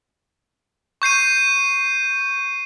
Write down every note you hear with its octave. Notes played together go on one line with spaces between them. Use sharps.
C#6 G6 C7 D#7